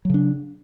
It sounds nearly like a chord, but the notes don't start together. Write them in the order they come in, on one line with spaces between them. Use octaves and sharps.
F#3 C#3 D4